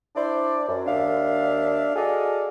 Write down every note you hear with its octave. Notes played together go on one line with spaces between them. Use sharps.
D4 E4 C5 D5
F#2
D#2 D4 E5 F5
F#4 G#4 A4 D5 D#5 F5